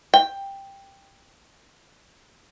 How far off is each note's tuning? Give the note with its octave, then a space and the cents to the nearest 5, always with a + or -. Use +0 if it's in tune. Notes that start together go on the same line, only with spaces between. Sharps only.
G5 +10